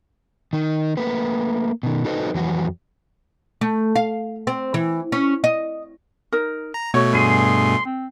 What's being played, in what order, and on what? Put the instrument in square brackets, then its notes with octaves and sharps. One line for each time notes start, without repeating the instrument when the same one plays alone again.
[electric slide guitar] D#3 D#4
A3 A#3 B4
B2 D#3
D#4 F#4 A4 B4 C5 D#5
F2 E3 F#3 F#4
[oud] A3
F5
C4
E3
C#4
D#5
[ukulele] D#4 A#4
[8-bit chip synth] A#5
[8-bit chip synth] B2 A3 [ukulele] F#4 C#5
[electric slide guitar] G2 G#4 [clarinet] C6
[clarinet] C4